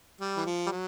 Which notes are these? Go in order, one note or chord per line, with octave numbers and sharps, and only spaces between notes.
G3
E3
F3
G3
F#3